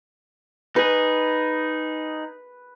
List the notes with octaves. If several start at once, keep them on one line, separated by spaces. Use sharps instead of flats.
D#4 G#4 B4